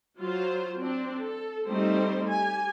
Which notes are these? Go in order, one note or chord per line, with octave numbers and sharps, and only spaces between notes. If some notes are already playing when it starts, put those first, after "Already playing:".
F#3 F4 C5
C4 D4
A4
G3 A3 C4 D#4 G4 C5
G4 G#5